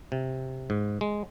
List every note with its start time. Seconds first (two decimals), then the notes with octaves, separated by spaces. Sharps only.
0.12 C3
0.70 G#2
1.01 G#3